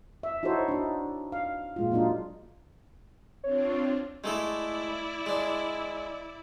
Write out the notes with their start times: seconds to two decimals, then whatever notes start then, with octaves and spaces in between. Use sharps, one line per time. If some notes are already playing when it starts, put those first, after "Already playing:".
0.23 E5
0.43 D#4 E4 F#4 A4 C5 C#5
0.68 D4 D#4
1.32 F5
1.76 A#2 G#3 F4
1.91 F#3 A#3 D4 D#4 F4
3.44 C4 D4 F4 C#5
4.24 G#3 A3 E4 A4 D5
5.26 G#3 D4